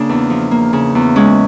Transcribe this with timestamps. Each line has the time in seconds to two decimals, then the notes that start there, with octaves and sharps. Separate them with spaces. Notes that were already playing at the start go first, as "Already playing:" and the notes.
Already playing: C#3 A#3 D4
0.09 E2
0.30 F3
0.51 A#3
0.73 C#3
0.95 E2
1.16 G#3 C#4